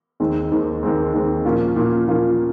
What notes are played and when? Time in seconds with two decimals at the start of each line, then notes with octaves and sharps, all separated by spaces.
0.20 D#2 D#3 G#3 C4
0.51 D#2 D#3 G#3 C4
0.83 D#2 D#3 G#3 C4
1.13 D#2 D#3 G#3 C4
1.45 A#2 F3 A#3 C#4 F4
1.76 A#2 F3 A#3 C#4 F4
2.07 A#2 F3 A#3 C#4 F4